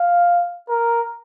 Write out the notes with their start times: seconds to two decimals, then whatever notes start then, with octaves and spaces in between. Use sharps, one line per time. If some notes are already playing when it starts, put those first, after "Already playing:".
Already playing: F5
0.70 A#4